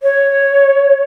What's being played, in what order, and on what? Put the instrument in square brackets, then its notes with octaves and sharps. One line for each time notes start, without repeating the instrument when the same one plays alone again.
[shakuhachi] C#5